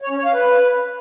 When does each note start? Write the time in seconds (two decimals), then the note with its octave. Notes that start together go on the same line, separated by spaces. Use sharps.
0.02 C#5
0.10 C#4
0.17 C#5
0.25 F5
0.33 B4